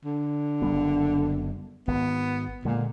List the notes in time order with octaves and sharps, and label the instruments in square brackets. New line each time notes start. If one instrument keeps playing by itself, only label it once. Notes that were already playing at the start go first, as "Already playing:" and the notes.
[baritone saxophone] D3
[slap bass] F#1 G3 B3
[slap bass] G#1 [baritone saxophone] B3
[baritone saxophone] A#2 [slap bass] D3 G#3